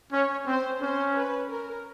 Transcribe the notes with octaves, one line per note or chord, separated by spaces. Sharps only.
C#4 C#5
C4 C5
C#4 C5
B4
A#4